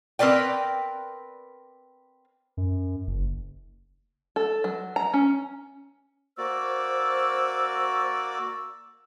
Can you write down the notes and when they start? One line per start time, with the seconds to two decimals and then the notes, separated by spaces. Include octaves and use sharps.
0.19 C4 A#4 B4 D5 G5
2.57 F#2
3.07 F#1
4.36 A4
4.64 F#3
4.96 A#5
5.14 C#4
6.38 A#3 F#4 C5 D5 E6